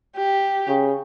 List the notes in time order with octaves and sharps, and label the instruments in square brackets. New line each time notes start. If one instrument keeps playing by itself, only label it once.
[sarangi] G4
[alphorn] C#3